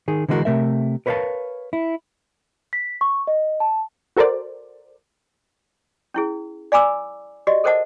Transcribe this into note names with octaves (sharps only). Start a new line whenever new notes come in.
D#3 G#4
D3 E3 G#3 C4 F#4 A#4
C3 A3 A#4 E5
A#4 B4 C#5 D#5 F5 A5
E4
B6
C#6
D#5
A5
F#4 A4 A#4 C5 D5
C#4 E4 G#4
D5 F5 G#5 B5 D6 E6
F#4 G4 D5 D#5
A4 A#4 C5 D#5 F#5 A5